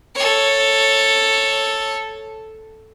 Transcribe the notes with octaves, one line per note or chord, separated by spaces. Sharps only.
A4 C#5